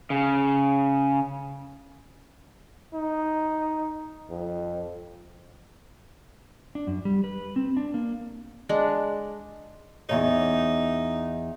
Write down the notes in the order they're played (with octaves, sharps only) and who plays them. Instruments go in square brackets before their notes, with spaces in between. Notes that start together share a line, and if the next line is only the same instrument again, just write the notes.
[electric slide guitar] C#3
[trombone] D#4
F2
[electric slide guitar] D4
F#2
G3
B4
C4
D4
A#3
[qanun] G#3 D4
[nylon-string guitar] E2 C3 C#5 [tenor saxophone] D#4